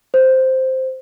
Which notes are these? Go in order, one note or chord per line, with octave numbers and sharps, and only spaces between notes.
C5